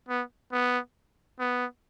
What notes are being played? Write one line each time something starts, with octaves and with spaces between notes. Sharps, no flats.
B3
B3
B3